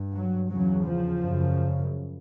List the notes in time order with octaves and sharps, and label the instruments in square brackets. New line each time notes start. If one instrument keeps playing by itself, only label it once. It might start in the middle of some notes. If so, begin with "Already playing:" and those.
Already playing: [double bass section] G2
F#3
E2 C#3 F#3
F3
F#2 C#3